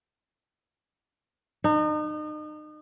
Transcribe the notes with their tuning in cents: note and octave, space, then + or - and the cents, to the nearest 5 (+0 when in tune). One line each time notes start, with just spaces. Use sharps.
D#4 -35